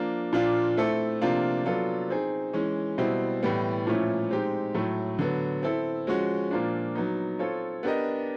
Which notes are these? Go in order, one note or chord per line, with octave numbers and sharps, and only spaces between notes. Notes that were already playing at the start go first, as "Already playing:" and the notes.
Already playing: F3 A#3 D4
A#2 F3 A#3 D4 F4
A3 C4 E4 A4
C3 F3 A#3 D4 F4
F#3 B3 D4 F4 A4
C4 D#4 G#4
E3 G#3 C#4
B2 G3 C4 E4
A2 E3 G3 B3
A#2 F3 A3 C#4 E4
G#3 C4 D#4 G4
A2 F#3 A3
D3 F#3 B3
C4 E4 A4
F3 G#3 C#4 F#4
A#2 F3 A#3 D4
F#3 B3 D#4
C4 F4 A4 C#5
B3 D4 G4 A#4 D#5